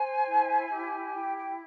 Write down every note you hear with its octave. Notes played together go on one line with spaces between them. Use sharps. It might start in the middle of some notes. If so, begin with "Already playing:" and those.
Already playing: C5 G#5
E4
G4
E4 G5
G5